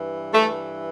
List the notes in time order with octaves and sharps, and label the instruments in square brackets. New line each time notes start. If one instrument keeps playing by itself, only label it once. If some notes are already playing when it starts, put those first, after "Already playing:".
Already playing: [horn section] G2 E3
A3